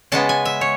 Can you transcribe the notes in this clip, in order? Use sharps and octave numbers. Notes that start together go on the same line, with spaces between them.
C#3 G#3 B3 A5
G#5
E5
C#5